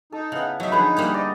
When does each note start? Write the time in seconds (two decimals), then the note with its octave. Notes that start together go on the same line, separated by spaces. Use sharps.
0.12 D#4 A4
0.32 C#3 B3 E4 F#5
0.60 F#3 D#4 E5
0.72 D3 F3 E4 G#4 B4 B5
0.97 G3 A#3 G4
1.14 D5 D#5